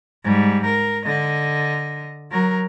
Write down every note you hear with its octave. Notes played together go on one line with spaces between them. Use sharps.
G#2 G3
A#4
D3 D#5
F#3 A#4